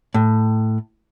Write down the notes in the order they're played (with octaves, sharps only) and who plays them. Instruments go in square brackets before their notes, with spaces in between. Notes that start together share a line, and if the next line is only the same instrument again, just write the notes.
[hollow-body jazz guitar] A2